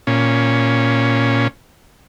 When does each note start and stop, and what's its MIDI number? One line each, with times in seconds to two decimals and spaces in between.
0.07 1.48 46
0.07 1.48 61